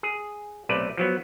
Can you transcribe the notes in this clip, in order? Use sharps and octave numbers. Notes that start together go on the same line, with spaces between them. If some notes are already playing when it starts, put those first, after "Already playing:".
G#4
B1 C3 A3 B4 D5
F3 F#3 B3